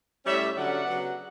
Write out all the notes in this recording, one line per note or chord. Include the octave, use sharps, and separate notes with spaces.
A2 G3 C#4 C#5 E5
D3 F#3 C#4 D5 F#5
C#3 F#3 B3